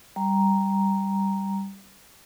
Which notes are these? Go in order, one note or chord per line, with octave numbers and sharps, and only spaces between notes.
G3 A#5